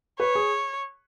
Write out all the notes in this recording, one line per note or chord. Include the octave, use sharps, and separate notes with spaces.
B4 C#5
G#4